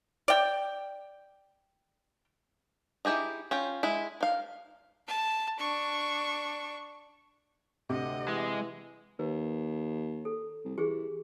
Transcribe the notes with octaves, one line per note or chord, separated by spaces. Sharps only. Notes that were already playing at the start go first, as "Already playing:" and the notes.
D5 G5
D#4 E4 G4 G#4 D#5
C#4 F4 G5
G#3 E4
D#3 F5
A5
D4 C#6
D2 C3 D#5 F#5
E3 G#3
D#2 B4
A4
C2
E3 G4 G#4